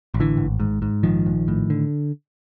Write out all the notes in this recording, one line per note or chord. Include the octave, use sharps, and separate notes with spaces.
A1
D3 E3
G#1
G#2
G#2
A#1 D#3 F3
A#1
A2
D3